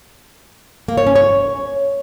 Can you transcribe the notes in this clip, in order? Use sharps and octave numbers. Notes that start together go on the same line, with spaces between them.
A#3
C#5
C#4
C#5